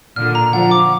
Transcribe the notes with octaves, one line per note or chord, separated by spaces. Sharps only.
A#2 D3 F6
A#5
D3 F3 F#5
D6